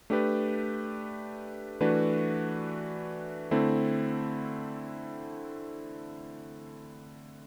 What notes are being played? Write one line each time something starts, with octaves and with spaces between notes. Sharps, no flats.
A3 D4 G4 B4
E3 A3 D4 F#4 B4
D3 A3 C4 E4